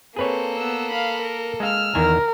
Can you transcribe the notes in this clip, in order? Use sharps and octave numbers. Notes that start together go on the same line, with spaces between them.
A#3 C4 G#4 A4 B4 C#5
B3 E6
F5 B5
A#4
G#3 F5 E6 F6
E2 D#3 A#4 G#5